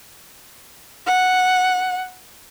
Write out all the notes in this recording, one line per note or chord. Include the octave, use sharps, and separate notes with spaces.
F#5